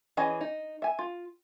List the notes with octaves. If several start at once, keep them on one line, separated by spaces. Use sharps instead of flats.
E3 C#4 G#4 D#5
D#4
E5 G#5
F4